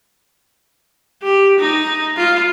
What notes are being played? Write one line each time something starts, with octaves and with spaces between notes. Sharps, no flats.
G4
D#4
F4